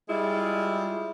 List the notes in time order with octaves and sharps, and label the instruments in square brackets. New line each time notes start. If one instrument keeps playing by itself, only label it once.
[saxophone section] G3 G#3 E4 F4